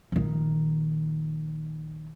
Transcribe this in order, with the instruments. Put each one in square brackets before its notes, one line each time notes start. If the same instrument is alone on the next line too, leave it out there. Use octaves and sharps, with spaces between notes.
[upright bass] A#1 D#3